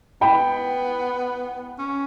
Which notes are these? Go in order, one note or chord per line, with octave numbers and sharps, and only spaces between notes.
B3 G5 B5
C#4